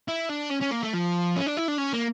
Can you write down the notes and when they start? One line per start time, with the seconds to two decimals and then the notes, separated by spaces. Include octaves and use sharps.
0.08 E4
0.29 D4
0.51 C#4
0.62 C#4
0.72 A#3
0.83 A3
0.94 F3
1.36 C#4
1.46 D4
1.57 E4
1.68 D4
1.78 C#4
1.93 A#3